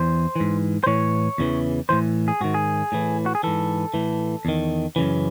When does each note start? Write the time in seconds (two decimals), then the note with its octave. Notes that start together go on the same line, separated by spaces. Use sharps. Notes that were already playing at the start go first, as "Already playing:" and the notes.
Already playing: E2 E3 C5
0.36 G#2 E3
0.84 C5
0.87 A2 E3 C#5
1.38 E2 C#3 E3
1.89 A2 E3 C5
2.28 G#4
2.41 G#2 D#3 F#4
2.54 G#4
2.92 A2 E3
3.26 F#4
3.35 G#4
3.43 G#2 E3 A4
3.94 A2 E3
4.45 E2 D#3
4.96 F#2 C#3 E3